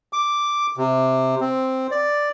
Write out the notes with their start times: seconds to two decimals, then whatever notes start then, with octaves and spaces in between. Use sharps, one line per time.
0.13 D6
0.77 C3
1.41 C4
1.91 D5